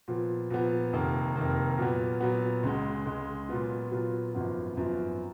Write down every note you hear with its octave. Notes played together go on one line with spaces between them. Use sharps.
A#2 F3 B3
A#2 F3 B3
F1 F2 D#3 A#3
F1 F2 D#3 A#3
A#2 F#3 B3
A#2 F#3 B3
C#2 C#3 G#3
C#2 C#3 G#3
A#2 F#3 B3 F4
A#2 F#3 B3 F4
G#1 F#2 F3 B3 F4
G#1 F#2 F3 B3 F4